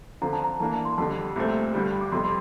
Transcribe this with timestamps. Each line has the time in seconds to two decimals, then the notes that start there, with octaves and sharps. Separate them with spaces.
0.22 D3 F3 C4 F4 A#5
0.33 A5
0.44 A#5
0.60 E3 A#3 D4 A5
0.73 A5
0.85 C6
0.98 F2 D3 G3 A5
1.36 C2 A#2 A3 C4
1.74 G2 D3 G3
2.01 D6
2.12 F2 C3 G3 C6
2.25 C6